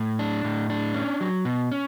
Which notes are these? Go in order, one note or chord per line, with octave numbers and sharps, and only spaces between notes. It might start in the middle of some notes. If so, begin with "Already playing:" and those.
Already playing: A2
D4
A2
D4
C#4
F#3
B2
C#4